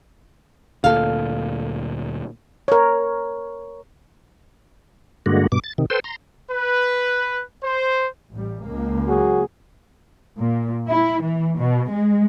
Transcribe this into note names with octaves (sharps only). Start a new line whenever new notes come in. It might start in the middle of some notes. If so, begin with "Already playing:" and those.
D2 A#2 A4 F5
A#4 C#5
G2 D3 G#3 A#3 F#4
G2 B2 D6
A6
C3 D#3
A4 B4 C5 G5 C6
A#5 C6
B4
C5
A1 G3
C#2 A#3
F#3 F#4 G#4
A#2
E4
E3
B2
G#3